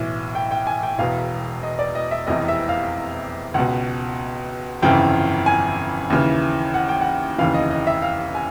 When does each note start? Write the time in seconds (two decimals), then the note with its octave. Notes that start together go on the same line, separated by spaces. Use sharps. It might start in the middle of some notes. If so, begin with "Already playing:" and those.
Already playing: B1 A2 E3
0.35 G5
0.51 G5
0.67 G#5
0.83 G5
0.98 E1 E2 B2 F5
1.63 D#5
1.79 D5
1.95 D#5
2.11 E5
2.27 F1 E2 C3 E3 D#5
2.48 E5
2.69 F5
3.54 C#2 B2 F#5
4.82 G1 F2 C#3 E3 G5
5.46 G#5
6.10 D#2 C#3 E3
6.74 F#5
6.89 G5
7.01 F#5
7.38 F1 D#2 C#3 E3 F5
7.54 D#5
7.71 D#5
7.87 E5
8.02 F5
8.35 G#5